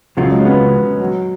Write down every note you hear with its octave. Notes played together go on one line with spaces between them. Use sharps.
C#2 C#3 F3 F#3 A3 F4
G#3
C#4
B3
F#3